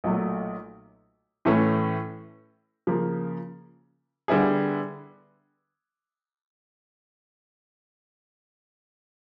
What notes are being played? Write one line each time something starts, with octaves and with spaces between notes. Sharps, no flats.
B1 A#2 F#3 A3
A2 E3 A3 C#4
C#3 F3 A#3
D3 G3 B3 E4 G#4